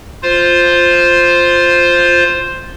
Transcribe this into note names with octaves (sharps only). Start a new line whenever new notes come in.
F4 C5